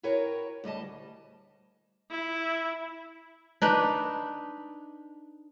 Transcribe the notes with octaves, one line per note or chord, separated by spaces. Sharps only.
E4 F#4 A#4 B4 C#5 G5
D2 G3 D#5 A5
E4
D4 D#4 B4